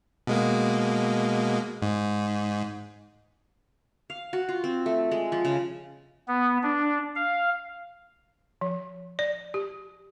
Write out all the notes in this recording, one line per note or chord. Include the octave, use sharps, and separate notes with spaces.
B2 G#3 A#3
G#2
F5
F#4
F4
C4
A3
G#3
F3
C#3
B3
D4
F5
F3
D5
G4